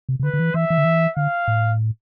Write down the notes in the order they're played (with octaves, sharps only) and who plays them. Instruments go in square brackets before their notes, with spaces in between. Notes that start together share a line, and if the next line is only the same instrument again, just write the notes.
[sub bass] C3
C3
[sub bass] D3 [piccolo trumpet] B4
[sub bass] D3
E3
[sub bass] E3 [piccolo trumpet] E5
[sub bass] E3
D3
E3
[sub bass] D3 [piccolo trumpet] F5
[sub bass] A2